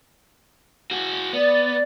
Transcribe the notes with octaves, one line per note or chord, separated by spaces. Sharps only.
F#4 G#4
B3 D5